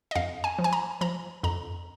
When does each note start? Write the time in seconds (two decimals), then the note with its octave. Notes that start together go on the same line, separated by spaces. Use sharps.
0.11 D#5
0.15 F2 F5
0.44 G#5
0.59 F3
0.64 G#5
0.73 A#5
1.01 F3 A#5
1.43 F2 A#5